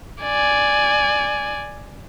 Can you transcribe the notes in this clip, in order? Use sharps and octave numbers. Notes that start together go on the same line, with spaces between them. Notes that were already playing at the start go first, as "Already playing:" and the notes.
D5 G#5